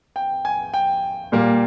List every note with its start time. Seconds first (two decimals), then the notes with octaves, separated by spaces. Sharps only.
0.16 G5
0.45 G#5
0.74 G5
1.32 A#2 G3 A#3